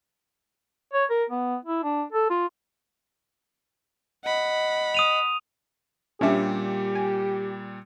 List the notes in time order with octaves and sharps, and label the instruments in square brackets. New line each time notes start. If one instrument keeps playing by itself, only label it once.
[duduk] C#5
A#4
B3
E4
D4
A4
F4
[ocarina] D#5 [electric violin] F#5 B5
[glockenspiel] D#6 D#7 F7
[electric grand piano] A#2 G3 [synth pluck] C#4 D4 E5 [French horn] G4
[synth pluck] G#5